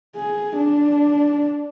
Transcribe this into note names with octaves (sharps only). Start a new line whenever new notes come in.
G#4
D4